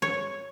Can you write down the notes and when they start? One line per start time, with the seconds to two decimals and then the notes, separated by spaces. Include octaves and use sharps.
0.02 C#5